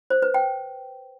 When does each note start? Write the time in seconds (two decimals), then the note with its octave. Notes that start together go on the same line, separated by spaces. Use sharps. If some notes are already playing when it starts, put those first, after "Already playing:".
0.10 C5
0.22 B4
0.34 G5